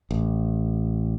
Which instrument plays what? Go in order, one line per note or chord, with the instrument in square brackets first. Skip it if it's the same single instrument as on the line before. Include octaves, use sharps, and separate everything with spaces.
[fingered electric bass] A1